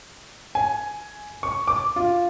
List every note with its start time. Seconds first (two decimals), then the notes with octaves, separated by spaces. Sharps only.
0.55 G#5
1.43 C#6
1.68 D6
1.96 F4